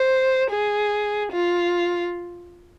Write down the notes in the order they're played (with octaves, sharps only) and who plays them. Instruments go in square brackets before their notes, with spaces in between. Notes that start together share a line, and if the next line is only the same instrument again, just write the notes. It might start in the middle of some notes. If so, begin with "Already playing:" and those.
Already playing: [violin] C5
G#4
F4